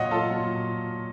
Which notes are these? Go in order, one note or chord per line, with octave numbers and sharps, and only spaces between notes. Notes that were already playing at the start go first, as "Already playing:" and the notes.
Already playing: A#2 F#3 C#5 D#5 F5 F#5
F4 A4
A#2 F#3